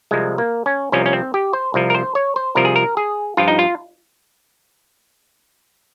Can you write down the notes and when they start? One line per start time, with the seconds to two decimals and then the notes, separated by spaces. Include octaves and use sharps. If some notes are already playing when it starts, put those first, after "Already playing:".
0.11 C2 C3 F3 G#3
0.38 A#3
0.66 C#4
0.92 C2 C3 F3 C#4
1.06 C#4
1.13 C4
1.34 G4
1.53 C5
1.74 C2 C3 F3
1.90 A#4
1.95 C5
2.15 C#5
2.36 C5
2.55 C2 C3 F3 A#4
2.65 G#4
2.76 A#4
2.97 G#4
3.37 G2 F3 F4
3.48 D#4
3.59 F4